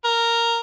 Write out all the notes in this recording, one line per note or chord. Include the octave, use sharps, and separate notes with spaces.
A#4